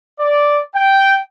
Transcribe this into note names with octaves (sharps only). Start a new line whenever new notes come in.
D5
G5